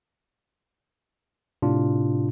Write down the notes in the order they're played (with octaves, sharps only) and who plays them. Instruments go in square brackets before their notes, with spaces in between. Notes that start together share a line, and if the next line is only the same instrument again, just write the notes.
[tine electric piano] A2 C3 D4 F4